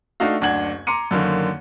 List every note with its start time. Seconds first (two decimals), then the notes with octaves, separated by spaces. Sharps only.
0.20 A3 D4 D#4 F#4 F5
0.41 F#1 D2 D4 F#5 G#6 F#7
0.87 A#5 C6 D6 C#7 D#7
1.11 F#2 D3 D#3 A#3